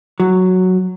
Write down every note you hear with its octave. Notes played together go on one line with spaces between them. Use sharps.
F#3